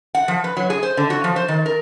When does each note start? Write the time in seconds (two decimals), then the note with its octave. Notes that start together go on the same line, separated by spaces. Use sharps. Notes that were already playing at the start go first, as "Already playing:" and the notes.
0.15 F#5
0.28 F3
0.44 B4
0.57 F#3
0.70 G#4
0.83 C5
0.97 D3
1.10 F#4
1.24 F3
1.36 C5
1.48 D#3
1.66 A#4